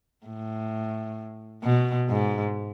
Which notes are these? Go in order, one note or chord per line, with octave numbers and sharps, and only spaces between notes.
A2
B2
G#2